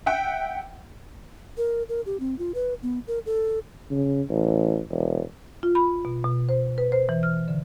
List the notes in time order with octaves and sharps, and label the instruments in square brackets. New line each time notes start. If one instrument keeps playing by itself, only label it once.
[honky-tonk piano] E5 F#5 G5
[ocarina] A#4
A#4
G4
C4
F4
B4
B3
A#4
A4
[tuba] C#3
A1
E1
[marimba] F4
B5
B2
B2
C5
B4
C5
E3
F6
D3